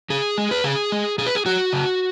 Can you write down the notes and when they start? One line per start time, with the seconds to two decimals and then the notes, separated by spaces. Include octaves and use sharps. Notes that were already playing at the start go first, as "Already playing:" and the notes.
0.10 C#3 G#4
0.38 G#3
0.51 B4
0.64 C#3 G#4
0.92 G#3
1.18 B2 G#4
1.27 B4
1.35 G#4
1.46 F#3 F#4
1.73 C#3